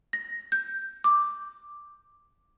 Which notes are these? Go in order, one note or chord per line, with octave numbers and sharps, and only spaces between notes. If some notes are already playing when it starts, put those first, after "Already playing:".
A#6
G6
D6